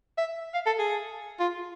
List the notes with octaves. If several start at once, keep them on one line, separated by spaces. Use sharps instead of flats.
E5
F5
A4
G#4
F4